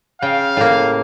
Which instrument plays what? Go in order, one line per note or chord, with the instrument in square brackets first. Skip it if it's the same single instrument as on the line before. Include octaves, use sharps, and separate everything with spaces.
[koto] C#3 G5 [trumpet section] F5
[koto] A2 A#3